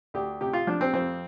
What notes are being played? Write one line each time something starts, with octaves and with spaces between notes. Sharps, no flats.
D2 G4
C3 G4
F4
F3 D4
C4
F2 C4